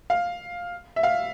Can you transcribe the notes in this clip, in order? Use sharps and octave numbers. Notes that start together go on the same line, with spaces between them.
F5
E5
F5